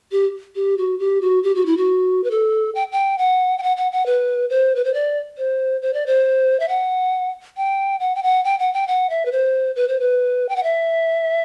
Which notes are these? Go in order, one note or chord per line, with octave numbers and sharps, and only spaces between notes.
G4
G4
F#4
G4
F#4
G4
F#4
E4
F#4
B4
A4
G5
G5
F#5
G5
F#5
F#5
F#5
B4
C5
B4
C5
D5
C5
C5
D5
C5
E5
F#5
G5
F#5
G5
F#5
G5
F#5
G5
F#5
E5
B4
C5
B4
C5
B4
G5
F#5
E5